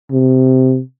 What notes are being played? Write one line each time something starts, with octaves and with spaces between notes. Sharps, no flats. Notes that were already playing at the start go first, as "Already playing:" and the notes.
C3